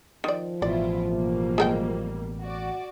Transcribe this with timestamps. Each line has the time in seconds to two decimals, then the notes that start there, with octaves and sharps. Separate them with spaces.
0.24 D#3 F3 D5
0.62 A1 B2 E4 F4 D5
1.10 B2 G3 A#3
1.58 G#3 A#4 G5
2.41 F#4 D5